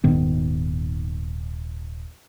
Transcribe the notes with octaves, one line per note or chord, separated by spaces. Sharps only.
D#1 G#2 D#3 B3